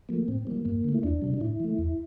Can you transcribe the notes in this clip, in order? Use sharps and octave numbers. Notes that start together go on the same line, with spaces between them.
F3 A3 A#3
A2 C4
E3 G3 A#3
G2 A#3
D3 A3
E4
E2 D4
C3 G3
D4
A2 E4
E3 A3
E2